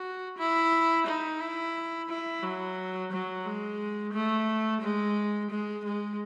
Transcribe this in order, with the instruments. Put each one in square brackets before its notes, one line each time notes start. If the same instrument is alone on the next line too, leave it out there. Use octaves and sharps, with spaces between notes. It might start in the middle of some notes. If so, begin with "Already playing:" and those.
Already playing: [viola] F#4
E4
D#4
E4
E4
F#3
F#3
G#3
A3
G#3
G#3
G#3